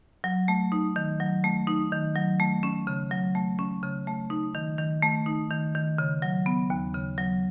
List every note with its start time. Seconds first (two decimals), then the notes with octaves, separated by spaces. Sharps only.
0.24 F#3
0.48 A3
0.72 D#4
0.96 D#3
1.20 F#3
1.44 A3
1.67 D#4
1.92 D#3
2.16 F#3
2.40 A3
2.63 C#4
2.87 C#3
3.11 F#3
3.35 A3
3.59 C#4
3.83 C#3
4.07 A3
4.30 D#4
4.55 D#3
4.79 D#3
5.02 A3
5.26 D#4
5.50 D#3
5.75 D#3
5.98 C#3
6.22 F#3
6.46 B3
6.70 D#2
6.94 C#3
7.18 F#3